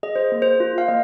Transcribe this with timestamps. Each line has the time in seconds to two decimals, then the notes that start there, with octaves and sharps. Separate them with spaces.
0.03 G#4 D#5
0.16 C5
0.32 A#3
0.42 C5
0.60 F4
0.78 F5
0.88 A#3 D#5